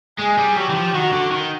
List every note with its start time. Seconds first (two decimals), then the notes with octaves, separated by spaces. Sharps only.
0.18 G#3 G#4
0.37 G3
0.56 F#3 G4
0.69 E3
0.75 F3
0.94 D#3 F#4
1.13 D3
1.31 D#3